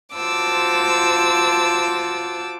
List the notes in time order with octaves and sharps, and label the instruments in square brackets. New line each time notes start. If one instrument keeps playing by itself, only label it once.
[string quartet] F4 F#4 C5 A5 D6 E6